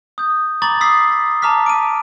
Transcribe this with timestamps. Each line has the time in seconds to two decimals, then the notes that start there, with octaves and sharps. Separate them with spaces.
0.18 D#6 G6
0.62 A#5 B5 C#6 D6 A6 F#7
0.81 D#6 E6 A6 B6 C7
1.42 A5 A#5 D6 F6 B6
1.66 D7 D#7